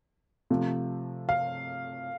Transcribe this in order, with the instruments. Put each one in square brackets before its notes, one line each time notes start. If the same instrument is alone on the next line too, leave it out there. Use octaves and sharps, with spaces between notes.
[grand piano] C3 F3 A3
[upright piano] F5